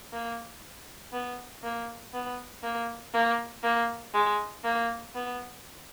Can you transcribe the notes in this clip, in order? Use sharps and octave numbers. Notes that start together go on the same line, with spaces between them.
A#3
B3
A#3
B3
A#3
A#3
A#3
G#3
A#3
B3